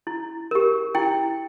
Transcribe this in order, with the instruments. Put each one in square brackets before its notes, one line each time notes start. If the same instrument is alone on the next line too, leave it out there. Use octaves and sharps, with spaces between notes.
[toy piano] E4
G4 A#4
E4 G5